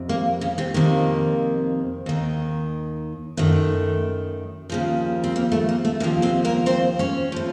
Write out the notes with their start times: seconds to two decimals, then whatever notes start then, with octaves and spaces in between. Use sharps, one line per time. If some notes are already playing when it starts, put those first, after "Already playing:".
Already playing: F2 C3
0.09 A#3
0.41 C#3 C#4
0.58 C3 C4
0.74 F2 C3 D#3 A#3
2.06 D#2 D#3
3.37 F#2 D#3 A3
4.70 D#2 C#3 F3
5.24 C4
5.36 A#3
5.52 A3
5.69 A#3
5.85 A3
6.00 D#2 C#3 F3 A#3
6.22 C3 C4
6.45 A#3 A#4
6.66 C4 C5
6.99 C#4 C#5
7.32 A2 F3